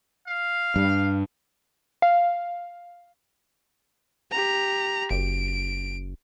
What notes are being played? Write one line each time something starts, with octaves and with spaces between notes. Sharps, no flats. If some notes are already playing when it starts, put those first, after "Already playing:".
F5
G2
F5
G4 A#5
F#1 D7